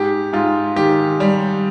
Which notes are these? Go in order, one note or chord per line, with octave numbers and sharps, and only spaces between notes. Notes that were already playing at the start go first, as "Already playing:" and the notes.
Already playing: G#2 G4
G#2 F4
D#3 G4
G3